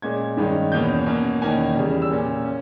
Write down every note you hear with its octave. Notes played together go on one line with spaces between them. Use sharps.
A#2 G#3 C#4 G#6
G2 D#3 G#3 C#4
E2 B2 A#3 C#4 G6
B2 A#3 C#4
E2 D#3 A#3 C#4 G#5
E2 C#3 G3
E6
A#2 A#3 C#4
C#4